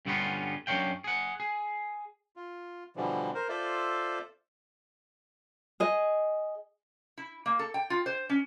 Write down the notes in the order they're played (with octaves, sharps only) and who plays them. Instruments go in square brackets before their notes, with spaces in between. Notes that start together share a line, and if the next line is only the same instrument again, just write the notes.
[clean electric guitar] G2 D3 G3 B3 C#4 F4
F#2 D4 C#5 F5 G5
G#4 F#5
G#4
[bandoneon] F4
B2 D3 E3 F3 G3
A#4 C5
F4 A4 C5 D5 E5
[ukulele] G#4 D#5
[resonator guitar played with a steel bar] E4
A#3
A4
G5
F4
C5
C#4